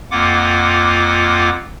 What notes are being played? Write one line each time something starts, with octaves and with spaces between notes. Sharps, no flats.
F2 A#3 F4 F#5 D6